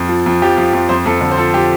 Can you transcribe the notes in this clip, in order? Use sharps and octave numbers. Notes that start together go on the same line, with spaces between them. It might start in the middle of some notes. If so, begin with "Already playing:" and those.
Already playing: F2
F3
F2
F3 G4
F2
F2
F2 C5
F2 A4
D3
C5
F3 A4
F3 G4